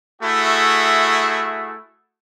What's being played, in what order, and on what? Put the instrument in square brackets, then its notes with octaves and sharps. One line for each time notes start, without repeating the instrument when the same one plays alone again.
[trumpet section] A3 E4 F#4 G#4